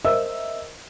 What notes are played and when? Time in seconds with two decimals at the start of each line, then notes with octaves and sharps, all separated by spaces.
0.04 A#4 C5 D#5 E5 E6